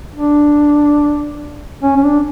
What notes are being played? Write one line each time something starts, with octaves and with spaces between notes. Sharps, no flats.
D4
C#4
C#4
D4